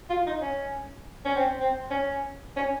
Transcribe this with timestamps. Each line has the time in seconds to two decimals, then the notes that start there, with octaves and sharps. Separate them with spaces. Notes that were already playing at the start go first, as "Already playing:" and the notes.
0.09 F4
0.26 D#4
0.42 C#4
1.25 C#4
1.36 C4
1.60 C4
1.90 C#4
2.56 C#4